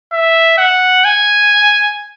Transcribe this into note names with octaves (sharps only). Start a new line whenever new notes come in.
E5
F#5
G#5